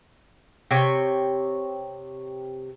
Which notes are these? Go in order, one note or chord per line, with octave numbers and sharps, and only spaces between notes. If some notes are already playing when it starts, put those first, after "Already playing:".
C3 C#5 G5